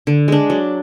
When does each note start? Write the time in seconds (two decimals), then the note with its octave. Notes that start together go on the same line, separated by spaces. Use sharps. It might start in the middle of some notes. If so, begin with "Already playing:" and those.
0.07 D3
0.28 G#3 D4
0.50 F#3